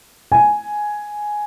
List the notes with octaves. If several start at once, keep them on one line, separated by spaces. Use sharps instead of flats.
G#5